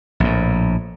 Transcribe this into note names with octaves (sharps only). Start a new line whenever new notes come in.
A#1 A2